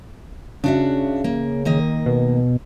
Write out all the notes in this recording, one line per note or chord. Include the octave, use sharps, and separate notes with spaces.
C#3 D4 F#4 E5
A#3
D#3 A#3 D#5
B2